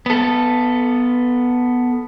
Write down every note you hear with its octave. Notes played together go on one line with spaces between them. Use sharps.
B3 A4